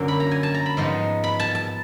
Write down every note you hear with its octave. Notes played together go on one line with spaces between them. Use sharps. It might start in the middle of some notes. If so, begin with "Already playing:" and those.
Already playing: F#2 D3 F#3 A#3 C#4
B5
A#5
G#5
A5
A#5
B5
G#2 F3 G#3 B3 D#4
B5
A5
A5